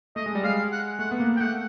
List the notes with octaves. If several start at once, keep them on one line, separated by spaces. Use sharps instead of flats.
A3 D#5
G#3
G3
G#3 F5
F#5
A3 F#5
B3
A#3
G5
A3 F#5